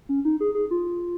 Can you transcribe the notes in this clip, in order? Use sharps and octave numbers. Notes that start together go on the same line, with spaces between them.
C#4
D#4
G#4
G#4
F4